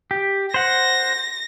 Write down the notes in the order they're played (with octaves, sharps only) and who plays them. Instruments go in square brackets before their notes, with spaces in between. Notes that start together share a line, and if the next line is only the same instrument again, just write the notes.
[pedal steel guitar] G4
[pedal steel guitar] C5 F#5 [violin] A#6